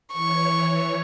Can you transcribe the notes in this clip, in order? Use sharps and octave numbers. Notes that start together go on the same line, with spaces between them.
E3 C#5 C#6